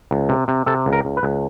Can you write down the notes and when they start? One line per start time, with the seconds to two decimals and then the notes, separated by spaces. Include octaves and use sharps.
0.11 C#2
0.29 C3
0.48 C3
0.66 C3 A4
0.86 C#2
0.93 A#4
1.05 C#2
1.17 B4
1.23 C#2